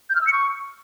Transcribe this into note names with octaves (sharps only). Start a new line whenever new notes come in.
G6
F6
E6
C#7
C#6